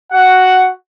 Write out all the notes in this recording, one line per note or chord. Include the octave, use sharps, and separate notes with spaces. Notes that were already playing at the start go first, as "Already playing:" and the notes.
F#4 F#5